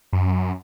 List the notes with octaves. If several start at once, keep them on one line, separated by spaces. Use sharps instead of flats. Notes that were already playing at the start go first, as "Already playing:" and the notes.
F#2